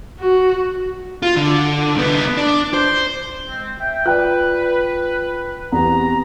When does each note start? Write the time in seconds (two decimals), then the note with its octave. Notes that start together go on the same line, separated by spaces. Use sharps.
0.19 F#4
1.23 F4
1.36 D3
1.95 C2 B3
2.37 D4
2.74 C5
3.48 G#3 C4
3.79 E5 G5
4.06 F4 B4 D5 G5 F#6
5.72 E2 B3 C4 G4 A#5